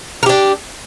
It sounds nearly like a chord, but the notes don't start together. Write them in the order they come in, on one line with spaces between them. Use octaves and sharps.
A#4 G4 D4